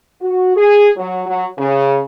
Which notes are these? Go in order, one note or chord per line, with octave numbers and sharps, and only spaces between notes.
F#4
G#4
F#3
F#3
C#3